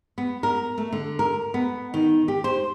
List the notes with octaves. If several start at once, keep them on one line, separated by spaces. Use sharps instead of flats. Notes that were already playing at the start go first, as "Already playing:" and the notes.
B3
A#4
A3
D3
A#4
B3
D#3
G4
C5